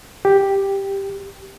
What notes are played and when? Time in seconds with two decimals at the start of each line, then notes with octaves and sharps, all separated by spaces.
0.25 G4